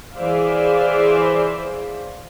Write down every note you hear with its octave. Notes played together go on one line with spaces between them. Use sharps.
E3 G#4 C5 D5 E5 F5